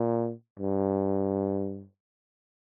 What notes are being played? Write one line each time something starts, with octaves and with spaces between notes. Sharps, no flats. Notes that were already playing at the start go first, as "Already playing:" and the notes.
Already playing: A#2
G2